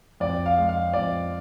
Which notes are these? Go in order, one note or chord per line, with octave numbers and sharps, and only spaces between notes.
F2 D5
F5
G#3
F5
F2 D5